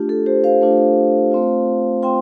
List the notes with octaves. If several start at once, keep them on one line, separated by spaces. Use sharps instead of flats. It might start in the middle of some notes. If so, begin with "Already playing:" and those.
Already playing: A3 D4 F4 G4
A4
G4 C5
C5 F5
A3 D4 F4
A3 C4 F4
C4 F4 G5 C6